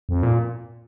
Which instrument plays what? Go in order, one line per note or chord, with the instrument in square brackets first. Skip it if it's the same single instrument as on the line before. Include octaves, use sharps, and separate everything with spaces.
[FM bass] F2
A#2